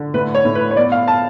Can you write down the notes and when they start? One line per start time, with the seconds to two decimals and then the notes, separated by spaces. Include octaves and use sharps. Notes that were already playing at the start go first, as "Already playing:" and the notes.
Already playing: D3
0.14 A2 B4
0.35 C#5
0.45 A2
0.55 B4
0.71 C#5
0.76 B3 D5
0.92 F5
1.08 A5